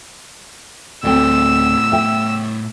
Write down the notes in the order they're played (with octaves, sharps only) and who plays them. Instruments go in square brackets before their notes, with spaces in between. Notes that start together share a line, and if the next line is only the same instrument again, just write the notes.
[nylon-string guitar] D2 C4 [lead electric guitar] A2 C5 [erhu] E6
[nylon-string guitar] E5 G5